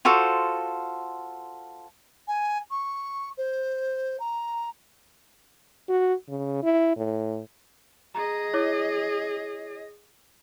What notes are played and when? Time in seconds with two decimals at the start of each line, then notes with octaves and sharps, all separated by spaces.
0.05 F4 F#4 A4 C5
2.28 G#5
2.71 C#6
3.37 C5
4.20 A#5
5.89 F#4
6.29 C#3
6.63 E4
6.97 A2
8.15 G#4 D#5 A#5
8.53 E4 C#5 D6